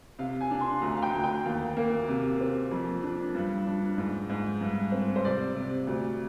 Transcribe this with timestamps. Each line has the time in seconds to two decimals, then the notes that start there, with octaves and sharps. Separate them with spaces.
0.19 C3 F5
0.41 G#5
0.51 D4
0.61 C6
0.82 D2 A#5
0.97 F5
1.03 G5
1.14 D2
1.24 G5
1.45 D#2 F5
1.77 A#3
2.09 C3
2.41 C4
2.72 F2
3.03 D4
3.35 G2
3.66 D4
3.98 G#2
4.30 G#2
4.61 G2
4.92 C4
5.16 C5
5.24 C3 D5
5.55 C3
5.87 D2